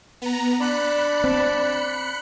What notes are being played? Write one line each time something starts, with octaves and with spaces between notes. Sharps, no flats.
B3 A#5
D4 B5 F#6 C#7
C4